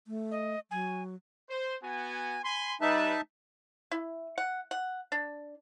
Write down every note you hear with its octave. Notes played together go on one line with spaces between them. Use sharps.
A3
D#5
F#3 G#5
C5
B3 F#4 G#5
G#5 B5 C6
G3 D#4 B4 E5 A5
E4
F#5
F#5
D4